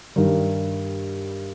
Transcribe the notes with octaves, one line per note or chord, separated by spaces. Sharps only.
G2 D#3 G3